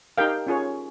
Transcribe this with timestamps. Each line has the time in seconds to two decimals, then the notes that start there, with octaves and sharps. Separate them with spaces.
0.18 D#4 G4 A#4 F5 G5
0.47 C#4 F4 G#4 C#5